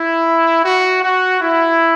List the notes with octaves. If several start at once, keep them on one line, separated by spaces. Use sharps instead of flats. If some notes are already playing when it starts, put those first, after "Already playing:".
Already playing: E4
F#4
F#4
E4